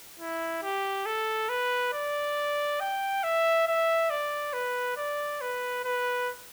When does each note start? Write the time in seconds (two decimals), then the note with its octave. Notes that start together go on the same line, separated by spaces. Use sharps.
0.20 E4
0.63 G4
1.06 A4
1.49 B4
1.93 D5
2.81 G5
3.24 E5
3.67 E5
4.10 D5
4.54 B4
4.97 D5
5.42 B4
5.85 B4